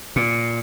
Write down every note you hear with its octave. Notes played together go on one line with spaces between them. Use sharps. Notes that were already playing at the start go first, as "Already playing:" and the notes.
A#2